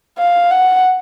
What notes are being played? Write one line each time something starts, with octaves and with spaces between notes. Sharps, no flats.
F5
F#5